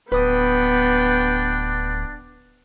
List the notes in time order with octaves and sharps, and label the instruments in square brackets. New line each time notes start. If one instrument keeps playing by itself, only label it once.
[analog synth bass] D1 [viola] B3 G5 [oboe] D4 [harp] B4 D#6